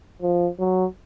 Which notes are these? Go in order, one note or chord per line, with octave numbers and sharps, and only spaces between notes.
F3
F#3